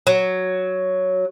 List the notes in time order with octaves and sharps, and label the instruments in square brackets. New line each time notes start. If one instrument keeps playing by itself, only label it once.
[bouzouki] F#3